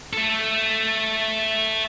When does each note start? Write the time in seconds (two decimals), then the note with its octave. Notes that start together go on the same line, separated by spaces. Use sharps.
0.13 A3 A4